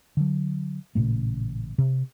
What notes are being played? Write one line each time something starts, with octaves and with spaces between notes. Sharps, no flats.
D3 F#3
A1 A#2 C#3 A3
C3